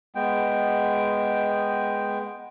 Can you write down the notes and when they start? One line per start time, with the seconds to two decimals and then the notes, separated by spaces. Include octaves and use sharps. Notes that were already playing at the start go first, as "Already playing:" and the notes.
0.15 G#3 B3 G5